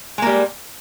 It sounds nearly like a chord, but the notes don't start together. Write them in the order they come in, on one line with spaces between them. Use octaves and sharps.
G#3 A#3 G3